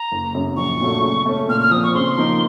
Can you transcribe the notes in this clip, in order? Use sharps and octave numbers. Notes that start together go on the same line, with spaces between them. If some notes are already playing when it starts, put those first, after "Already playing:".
Already playing: A#5
F#1
F#2 C#3
A#1 C#6
A#2 F#3 A3
C#3
A3 C#4
A#2 F6
F6
F3 C4 D#6
C#6
C#3 C6
F3 A#3 D#4 A#4